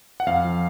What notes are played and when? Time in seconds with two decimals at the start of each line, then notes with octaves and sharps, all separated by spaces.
0.20 F#5
0.27 F2 F5
0.45 F3